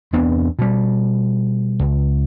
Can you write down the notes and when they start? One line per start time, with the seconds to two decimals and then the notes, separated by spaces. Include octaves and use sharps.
0.13 E2 B3 C4 D4
0.59 B2 G3
1.79 C#2